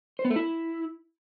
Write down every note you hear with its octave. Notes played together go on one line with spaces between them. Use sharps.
C5
B3
A3
E4